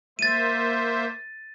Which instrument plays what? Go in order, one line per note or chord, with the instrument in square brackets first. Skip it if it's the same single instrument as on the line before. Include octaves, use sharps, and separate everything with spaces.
[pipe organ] A#3 C5 E5 [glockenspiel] A6 D#7